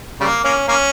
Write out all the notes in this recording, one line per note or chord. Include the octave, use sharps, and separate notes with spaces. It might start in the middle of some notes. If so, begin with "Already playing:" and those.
C#3 G3 A#3
A#3 C#4
A#3 C#4